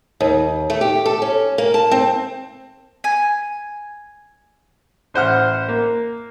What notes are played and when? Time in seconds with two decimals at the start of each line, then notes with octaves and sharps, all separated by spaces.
0.20 D#2
0.70 A3
0.81 G4
1.06 A4
1.22 C#4
1.58 A#3
1.74 A5
1.91 C4
3.04 G#5
5.14 A1 C5 F#5 F6
5.68 A#3